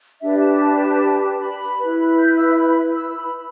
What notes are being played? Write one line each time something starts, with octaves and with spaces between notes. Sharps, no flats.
D4 G4 B4 E5
A5
A5
B5
E4 B4
G6
E6
B5
E6
B5